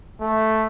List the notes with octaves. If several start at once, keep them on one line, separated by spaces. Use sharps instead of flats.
A3